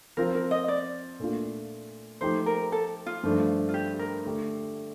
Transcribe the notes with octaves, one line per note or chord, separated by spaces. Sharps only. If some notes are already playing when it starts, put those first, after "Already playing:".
F3 C4 F4 A#4
A#4
D#5
D5
A#2 A3 D4 F4
F3 A3 D#4 G4 C5
A#4
A4
F4
G2 F3 A3 D4
F4
G4
A#4
D3 A3 D4 G4